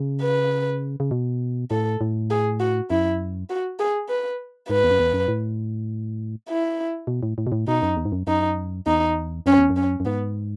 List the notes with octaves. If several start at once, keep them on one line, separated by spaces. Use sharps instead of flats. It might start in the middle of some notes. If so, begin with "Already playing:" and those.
Already playing: C#3
B4
C#3
B2
A2 A4
A2
G#4
F#4
F#2 E4
F#4
G#4
B4
G#2 B4
E2
F#2
E2
F#2
A2
E4
B2
A2
A2
B2
A2
B2 D#4
F#2
E2
G#2
F#2
F#2 D#4
E2 D#4
F#2 C#4
E2
F#2
C#4
F#2
G#2 B3